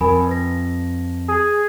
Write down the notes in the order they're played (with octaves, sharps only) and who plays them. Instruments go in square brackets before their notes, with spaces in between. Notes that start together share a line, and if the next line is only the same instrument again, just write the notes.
[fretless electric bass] F2 [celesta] A#4 G#5 B5
[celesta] B4 A#6
[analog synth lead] G#4